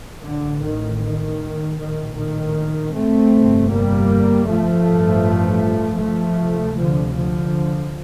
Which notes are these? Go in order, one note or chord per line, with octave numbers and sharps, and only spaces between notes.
A1 A2 D3
D#3
D#3
A#1 A2 D#3
D#3
A3 C4
G1 F2 C3
G3 A#3
F3 A3
A1 G2
F3 A3
D2 C3
D3 F3
D3 F3